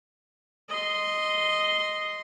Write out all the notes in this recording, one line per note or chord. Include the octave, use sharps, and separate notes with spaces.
D#5 C6